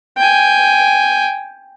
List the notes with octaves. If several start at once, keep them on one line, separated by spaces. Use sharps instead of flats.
G5 G#5